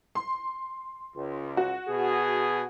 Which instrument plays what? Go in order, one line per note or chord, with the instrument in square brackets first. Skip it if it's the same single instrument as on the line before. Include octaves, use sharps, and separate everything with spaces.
[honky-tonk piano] C6
[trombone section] C#2
[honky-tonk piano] F#4
[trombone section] B2 G#4